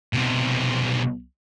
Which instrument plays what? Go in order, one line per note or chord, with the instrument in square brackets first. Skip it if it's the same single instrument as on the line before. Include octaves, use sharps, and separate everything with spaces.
[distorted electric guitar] B1 C3